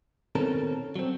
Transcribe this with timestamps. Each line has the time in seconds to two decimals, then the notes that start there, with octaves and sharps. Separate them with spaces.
0.35 B2 D#3 C4 C#4 A4 A#4
0.96 F#3 C4